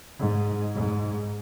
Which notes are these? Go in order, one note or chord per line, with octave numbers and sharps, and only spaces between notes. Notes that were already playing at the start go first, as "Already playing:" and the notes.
G#2
G#2